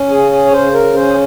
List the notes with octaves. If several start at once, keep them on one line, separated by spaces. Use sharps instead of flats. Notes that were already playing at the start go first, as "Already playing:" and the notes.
Already playing: C#4
C#3 G#4
G#4
C#5
C#3 C5
A#4
C#4 C5
G#4